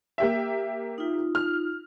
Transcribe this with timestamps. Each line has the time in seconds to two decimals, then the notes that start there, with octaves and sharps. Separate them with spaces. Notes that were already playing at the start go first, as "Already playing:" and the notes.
0.18 A#3 G4 E5
0.98 D#4 F4
1.35 F6